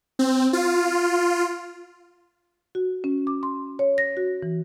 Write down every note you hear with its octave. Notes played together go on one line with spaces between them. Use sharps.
C4
F4
F#4
C#4
D6
C6
C#5
A#6
F#4
E3